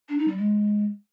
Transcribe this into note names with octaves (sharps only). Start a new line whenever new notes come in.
D4
D#4
G3
G#3